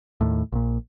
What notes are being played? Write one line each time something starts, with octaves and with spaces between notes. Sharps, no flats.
D#2 A2
A#1 A#2